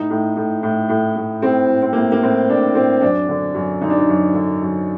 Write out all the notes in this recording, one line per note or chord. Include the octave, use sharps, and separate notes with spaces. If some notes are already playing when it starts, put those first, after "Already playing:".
Already playing: A2 D#4
A2
A2
A2
A2
A2
A2 C4
A2
C4
A2 A#3
A#3
A2 C4
A2 D4
A2 C4
F#2 D4
D3
F#2
D3 D#4
D4
D#4
F#2
D3
F#2